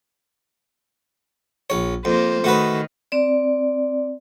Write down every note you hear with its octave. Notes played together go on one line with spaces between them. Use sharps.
A#1 C#5
F2 A#3 C5
D#3 A3 F#4 B4
C4 D5